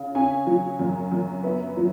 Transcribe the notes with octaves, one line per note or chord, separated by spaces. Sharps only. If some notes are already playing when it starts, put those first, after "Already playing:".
Already playing: C#3
C#4 G#5
F#3
F#2
F#2
B3 E5
F#3